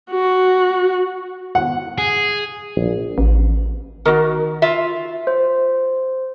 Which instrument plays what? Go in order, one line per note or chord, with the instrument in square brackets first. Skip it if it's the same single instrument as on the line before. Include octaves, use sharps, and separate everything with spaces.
[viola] F#4
[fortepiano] F#5
[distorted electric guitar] G#4
[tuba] A#1
[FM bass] A1
[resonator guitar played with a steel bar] D#3 [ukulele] F#4 A#4
[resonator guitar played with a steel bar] F4 E5
[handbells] C5